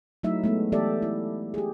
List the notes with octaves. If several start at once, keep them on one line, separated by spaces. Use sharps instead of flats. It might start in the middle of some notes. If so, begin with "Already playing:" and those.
F#3 A3 D#4 E4 E5
G#3 A3 B3 D#4
E3 B3 G4 A4 D5 E5
E4
G4 G#4